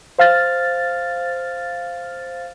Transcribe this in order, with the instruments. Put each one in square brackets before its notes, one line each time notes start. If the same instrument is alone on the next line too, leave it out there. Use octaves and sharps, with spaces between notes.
[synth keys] C5 F5 F6 A6